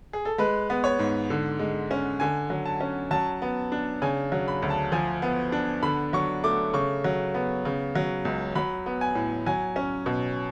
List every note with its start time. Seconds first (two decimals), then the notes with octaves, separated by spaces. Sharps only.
0.13 G#4
0.25 A4
0.38 G#3 B4
0.70 B3
0.84 C#5
0.99 G#2
1.30 D3
1.59 G#3
1.91 C#4
2.20 D3 G#5
2.50 F#3
2.65 A5
2.81 C#4
3.11 F#3 A5
3.42 B3
3.72 D4
4.02 C#3 G#5
4.32 F#3
4.48 B5
4.62 D2
4.70 A5
4.92 F3 G#5
5.22 B3
5.52 D4
5.83 D3 B5
6.13 F#3 C#6
6.44 A3 D6
6.73 C#3 C#6
7.04 F#3
7.34 B3
7.65 C#3
7.95 F#3
8.25 C#2
8.55 F#3 B5
8.86 B3
9.01 G#5
9.15 A2
9.46 F#3 G#5
9.76 C#4
10.06 B2